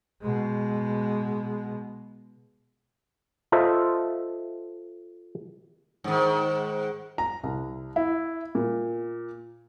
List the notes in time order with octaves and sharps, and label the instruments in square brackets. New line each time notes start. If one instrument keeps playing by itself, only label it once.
[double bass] B2 G#3
[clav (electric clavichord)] F4 A4 C5 D#5 E5
[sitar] G#2 D#3
[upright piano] A#5
C2
E4
A#2